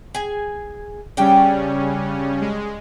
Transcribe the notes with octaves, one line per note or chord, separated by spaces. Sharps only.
G#4 G#5
C#3 G3 C#4 D4 G5
G#3